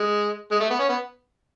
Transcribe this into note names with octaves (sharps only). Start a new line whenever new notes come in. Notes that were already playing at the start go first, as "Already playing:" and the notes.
Already playing: G#3
G#3
A3
B3
C#4
B3